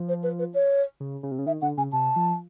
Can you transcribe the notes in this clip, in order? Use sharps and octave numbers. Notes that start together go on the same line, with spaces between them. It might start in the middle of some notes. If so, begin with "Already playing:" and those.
Already playing: F3
C5
B4
B4
C#5
C#3
C#3
C3
C#3
D#3 E5
D3 F#5
C#3 G#5
C3 A5
F3